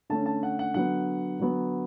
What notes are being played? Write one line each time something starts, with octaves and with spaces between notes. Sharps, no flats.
D3 A3 C#4 A5
A5
F#5
F#5
D3 F#3 B3 F#5
D3 F#3 B3